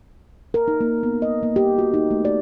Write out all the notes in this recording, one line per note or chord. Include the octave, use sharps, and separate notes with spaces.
A#4
D#4
A#3
B3
D#5
A#3
G4
F#4
D#4
A3
D5